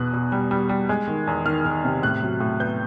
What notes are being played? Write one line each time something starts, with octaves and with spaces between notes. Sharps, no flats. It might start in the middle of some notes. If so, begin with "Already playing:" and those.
Already playing: E2 B2 F#6
B2
G3
G3
G3
G#3
D#3
E2
D#3 F6
D#3
C3
A2 F#6
F#3
A2
B3 G6